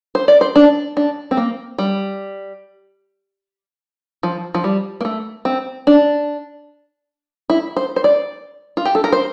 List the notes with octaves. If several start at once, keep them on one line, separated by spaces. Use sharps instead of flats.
C5
D5
C5
D4
D4
C4
A#3
G3
F3
F3
G3
A#3
A3
C4
D4
E4
C5
C5
D5
F4
G4
A4
A#4
C5